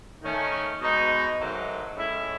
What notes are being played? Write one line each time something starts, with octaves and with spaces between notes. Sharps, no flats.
D#3 A3 C#4
B2 G#3 D#4
G#2 D#3 F#3 A3
A2 G#3 C#4 E4